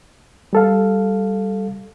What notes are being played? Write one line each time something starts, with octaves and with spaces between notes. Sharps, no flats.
G3 A4 F5